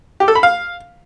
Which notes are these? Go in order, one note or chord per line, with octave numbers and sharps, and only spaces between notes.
G4
A4
B5
F5